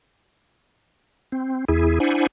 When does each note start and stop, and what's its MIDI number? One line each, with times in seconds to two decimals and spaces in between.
1.32 1.65 60
1.68 1.99 40
1.68 1.99 64
1.68 1.99 68
2.00 2.27 62
2.00 2.27 64
2.00 2.27 72
2.00 2.27 78
2.00 2.27 80